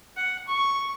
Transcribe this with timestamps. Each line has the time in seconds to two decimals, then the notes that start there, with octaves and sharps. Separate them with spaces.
0.17 F#5
0.47 C#6